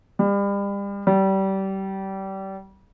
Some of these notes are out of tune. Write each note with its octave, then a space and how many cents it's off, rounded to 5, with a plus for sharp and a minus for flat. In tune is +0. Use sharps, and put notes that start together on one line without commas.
G3 +35
G3 -25